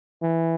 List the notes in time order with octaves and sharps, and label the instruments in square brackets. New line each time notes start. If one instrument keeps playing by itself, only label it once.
[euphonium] E3